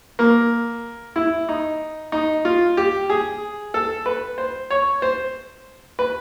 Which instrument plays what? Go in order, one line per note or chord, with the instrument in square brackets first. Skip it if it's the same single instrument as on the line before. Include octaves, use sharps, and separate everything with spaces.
[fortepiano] A#3
E4
D#4
D#4
F4
G4
G#4
A4
B4
C5
C#5
C5
B4